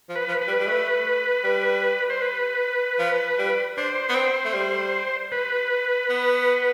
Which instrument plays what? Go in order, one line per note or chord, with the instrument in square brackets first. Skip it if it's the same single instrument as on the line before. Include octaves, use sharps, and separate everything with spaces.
[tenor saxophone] F3
[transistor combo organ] B4
[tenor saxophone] F3
[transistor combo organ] B4
[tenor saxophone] G3
G3
A3
G3
[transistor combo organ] C5
B4
[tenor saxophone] F3
G3
[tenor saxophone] D4 [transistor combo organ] C5
[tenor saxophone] B3
C4
A3
G3
[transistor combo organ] B4
[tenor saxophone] B3